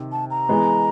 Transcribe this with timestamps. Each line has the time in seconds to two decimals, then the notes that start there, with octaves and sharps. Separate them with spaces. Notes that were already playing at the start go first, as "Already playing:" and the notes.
Already playing: C3 D#3
0.12 A5
0.30 A#5
0.49 E3 G#3 B3